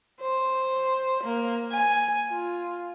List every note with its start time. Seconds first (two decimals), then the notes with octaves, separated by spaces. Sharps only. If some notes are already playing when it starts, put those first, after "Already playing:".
0.21 C5
1.24 A#3
1.72 G#5
2.29 F4